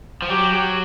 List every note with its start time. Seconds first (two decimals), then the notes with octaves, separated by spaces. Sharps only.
0.22 F3
0.30 F#3 G4